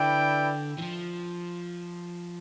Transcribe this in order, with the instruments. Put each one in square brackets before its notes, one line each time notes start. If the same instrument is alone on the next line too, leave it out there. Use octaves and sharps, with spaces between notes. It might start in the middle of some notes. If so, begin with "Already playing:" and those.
Already playing: [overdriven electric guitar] D3 [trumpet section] E4 B4 D5 G5
[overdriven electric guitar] E3
F3